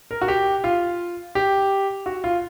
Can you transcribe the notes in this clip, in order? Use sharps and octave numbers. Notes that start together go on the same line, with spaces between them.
A#4
F#4
G4
F4
G4
F#4
F4